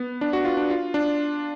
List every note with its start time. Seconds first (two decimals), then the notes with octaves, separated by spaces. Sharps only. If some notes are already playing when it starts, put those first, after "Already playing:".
Already playing: B3
0.21 D4
0.33 F#4
0.45 F4
0.57 D4
0.70 F4
0.94 D4